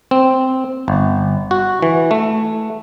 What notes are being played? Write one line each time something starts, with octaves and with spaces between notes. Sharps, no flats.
C4
G1
F#4
E3
A3